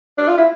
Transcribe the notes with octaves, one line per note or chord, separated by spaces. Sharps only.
D4
F4
E4